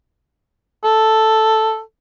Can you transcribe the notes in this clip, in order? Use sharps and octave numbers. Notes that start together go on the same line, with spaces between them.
A4